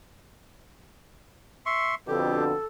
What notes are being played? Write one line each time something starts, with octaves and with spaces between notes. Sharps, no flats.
E5 C6 C#6
F2 B2 D3 G4 A4